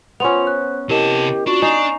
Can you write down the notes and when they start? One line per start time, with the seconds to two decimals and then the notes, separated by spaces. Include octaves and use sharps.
0.20 B3 C#4 F4 C5 C6 F7
0.47 F#6
0.89 C3 E4 G4 A#4 D#5 A5
1.47 D4 F4 F#4 C#6
1.62 D4 D#4 G#5 C7 F7